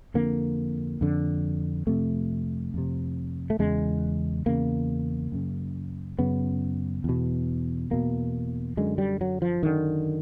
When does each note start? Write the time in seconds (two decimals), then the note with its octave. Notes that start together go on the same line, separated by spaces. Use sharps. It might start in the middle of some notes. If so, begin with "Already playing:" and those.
0.14 F2 D3 A#3
1.01 F2 D3
1.87 F2 C3 A3
2.74 F2 C3
3.50 A3
3.59 E2 C#3 G#3
4.46 E2 C#3 A#3
5.32 F#2 C#3
6.19 F#2 C#3 B3
7.04 E2 B2
7.91 E2 B2 A#3
8.77 F#2 D3 G#3
8.98 G3
9.21 F#3
9.42 F3
9.63 F#2 D3 D#3